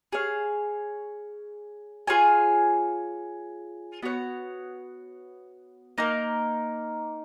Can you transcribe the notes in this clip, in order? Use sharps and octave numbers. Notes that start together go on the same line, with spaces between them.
G#4 C#5 F5
F4 G#4 C#5 G#5
B3 F#4 C#5 F#5
A#3 D#4 A#4